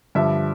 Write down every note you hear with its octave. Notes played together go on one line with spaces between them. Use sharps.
G2 D3 F3 E5